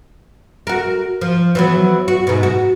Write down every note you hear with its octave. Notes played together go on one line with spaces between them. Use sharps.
F#4 A#4
F3
E3 F#3 B3
F#4
G#2 B2
F#4